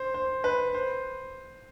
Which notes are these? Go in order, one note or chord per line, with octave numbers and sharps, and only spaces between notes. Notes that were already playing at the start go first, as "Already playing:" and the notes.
Already playing: C5
C5
B4
C5